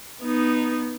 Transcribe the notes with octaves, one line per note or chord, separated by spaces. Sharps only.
B3 D#4